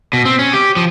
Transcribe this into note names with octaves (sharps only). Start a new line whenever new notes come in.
B2
C4
C#4
G4
F3